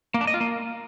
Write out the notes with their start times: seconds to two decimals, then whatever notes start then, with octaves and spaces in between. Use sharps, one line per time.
0.14 A#3
0.21 D4
0.27 D#5
0.34 F4
0.40 A#3